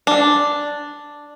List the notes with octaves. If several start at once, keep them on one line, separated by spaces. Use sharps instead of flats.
D4